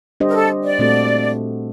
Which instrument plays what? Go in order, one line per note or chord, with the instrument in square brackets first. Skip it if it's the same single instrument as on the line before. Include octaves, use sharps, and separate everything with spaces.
[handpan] G3 D4 G4 C5 D#5
[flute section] A#4
A4
D5
[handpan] A#2 A3 C4 F#4 A4